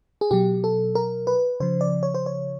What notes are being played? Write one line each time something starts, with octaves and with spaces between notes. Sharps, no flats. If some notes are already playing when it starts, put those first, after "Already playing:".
G#4
B2 F#3 G4
A4
A#4
B4
C#3 F3 C5
D5
C#5
C5
C#5